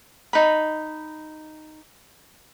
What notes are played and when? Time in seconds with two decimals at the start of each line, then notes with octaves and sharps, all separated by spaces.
0.33 D#4 B5